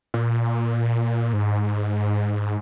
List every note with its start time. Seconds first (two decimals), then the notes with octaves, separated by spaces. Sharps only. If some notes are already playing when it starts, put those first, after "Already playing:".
0.14 A#2
1.33 G#2